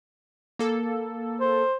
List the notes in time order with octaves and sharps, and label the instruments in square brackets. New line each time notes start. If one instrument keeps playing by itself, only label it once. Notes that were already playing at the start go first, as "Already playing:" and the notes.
[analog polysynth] A#3 A4
[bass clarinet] C5